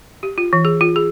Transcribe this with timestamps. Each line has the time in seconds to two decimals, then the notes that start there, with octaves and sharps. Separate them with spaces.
0.23 G4
0.38 F4
0.53 E3
0.65 G#4
0.81 F4
0.96 G#4